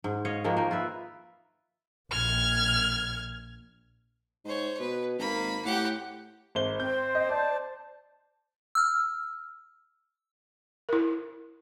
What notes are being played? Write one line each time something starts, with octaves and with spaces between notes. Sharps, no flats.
G#2
C#5 D#5 F5
D#3 F3 G#3 A#3
A#3 D#4
F4 B4 E5
A#1 F6 G#6
G#2 C5 C#5
B2 B4
G#1 A#3 B5
A2 G4 F#5
G#1 C5 G7
C4 C5 G6
D#5
D5 A5
E6 F6
E4 A#4